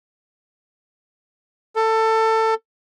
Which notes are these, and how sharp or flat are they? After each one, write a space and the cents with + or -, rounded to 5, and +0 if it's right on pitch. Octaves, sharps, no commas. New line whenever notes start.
A4 +20